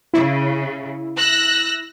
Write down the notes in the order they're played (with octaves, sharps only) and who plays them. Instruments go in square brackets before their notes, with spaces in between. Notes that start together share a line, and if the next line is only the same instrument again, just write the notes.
[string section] C#3 [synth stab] E4
[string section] E6 F#6 A#6